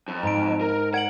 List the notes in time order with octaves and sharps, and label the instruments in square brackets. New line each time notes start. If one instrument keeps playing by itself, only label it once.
[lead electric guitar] F2
[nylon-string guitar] G#2 [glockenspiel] A#5 D7
[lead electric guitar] A#4
[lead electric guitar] F#5 [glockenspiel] G#6 D7 F#7